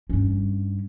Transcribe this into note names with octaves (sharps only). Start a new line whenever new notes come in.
G2 C#4